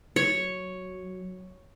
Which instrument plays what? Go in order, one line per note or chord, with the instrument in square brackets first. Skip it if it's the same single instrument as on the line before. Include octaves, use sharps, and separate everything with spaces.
[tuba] F#3 [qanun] C#5